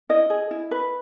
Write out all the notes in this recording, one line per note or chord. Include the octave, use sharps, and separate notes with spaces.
E4 D#5
G#4
E4
B4